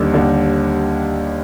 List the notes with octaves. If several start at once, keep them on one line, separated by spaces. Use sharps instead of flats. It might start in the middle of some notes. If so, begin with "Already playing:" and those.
Already playing: D#2 D3 G3 D#4
D#2 D3 G3